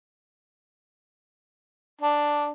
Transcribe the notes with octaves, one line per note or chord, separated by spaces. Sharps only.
D4